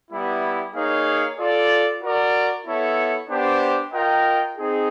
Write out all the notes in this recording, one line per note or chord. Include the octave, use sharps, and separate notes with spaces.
G3 B3 E4
A#3 D#4 G#4 C#5 F5
F4 A4 D5
F#4 A#4 D5
B3 E4 A4 C#5
B3 D4 G4 C5
F4 A#4 D#5 G5
C4 D#4 G#4